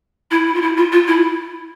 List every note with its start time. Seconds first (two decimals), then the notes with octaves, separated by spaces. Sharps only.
0.31 E4
0.47 E4
0.54 F4
0.62 E4
0.77 F4
0.92 F4
1.08 E4